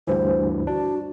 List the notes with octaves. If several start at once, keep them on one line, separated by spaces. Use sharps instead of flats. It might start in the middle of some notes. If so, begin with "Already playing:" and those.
D2 G2 E3 C5
D4 F#4